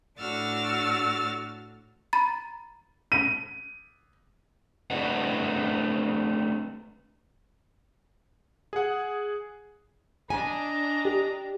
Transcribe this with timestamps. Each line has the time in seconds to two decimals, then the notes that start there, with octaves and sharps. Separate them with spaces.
0.19 A2 D4 F#4 E6 F6 A6
2.13 A#5 B5 A6
3.12 D#7
4.90 A3 C4 D4 B4 D#5 F#5
8.73 G#4 F#5
10.30 D4 D#5 G#5 A#5
11.05 G4